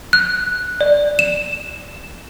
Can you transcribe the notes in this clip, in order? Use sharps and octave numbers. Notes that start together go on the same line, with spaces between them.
F#6
D5
E7